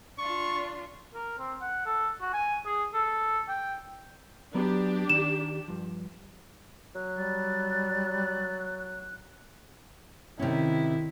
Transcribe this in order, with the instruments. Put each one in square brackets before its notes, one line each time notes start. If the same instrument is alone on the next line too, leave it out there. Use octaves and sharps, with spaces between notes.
[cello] D4 F4 [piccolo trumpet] C#6
[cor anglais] A#4
C4
F#5
A4
F#4
G#5
G#4
A4
G5
[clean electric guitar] F#3 B3 [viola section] D4 G4
[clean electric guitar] D#3 [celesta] E7
[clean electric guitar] G2 F3
[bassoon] F#3 [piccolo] F#6
[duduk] G3 [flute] A6
[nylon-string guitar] C3 C#4 [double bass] D#3 [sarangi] E4